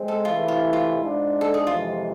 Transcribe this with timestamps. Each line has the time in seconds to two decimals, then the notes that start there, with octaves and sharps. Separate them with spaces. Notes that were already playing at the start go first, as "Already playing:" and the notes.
Already playing: G#3 C4
0.08 A4
0.25 C3 E3 A3 E4 F4
0.48 F4
0.73 F4
0.97 G#2 G#3 D4
1.41 A4
1.54 G#4
1.67 F2 C3 E3 G#3 F4